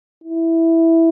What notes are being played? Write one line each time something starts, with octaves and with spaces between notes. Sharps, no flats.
E4